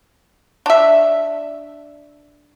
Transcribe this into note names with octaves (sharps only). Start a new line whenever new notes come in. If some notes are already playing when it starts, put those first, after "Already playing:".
D4 E5